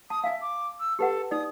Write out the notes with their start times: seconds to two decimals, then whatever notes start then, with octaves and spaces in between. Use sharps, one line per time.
0.10 A5 D#6
0.24 E5 F5 G#5
0.41 D6
0.80 E6
0.99 G4 A4 B4 F#5
1.31 D#4 D5 D#6